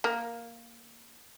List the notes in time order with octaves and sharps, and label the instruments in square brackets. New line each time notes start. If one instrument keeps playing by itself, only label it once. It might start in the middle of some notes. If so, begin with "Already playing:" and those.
[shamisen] A#3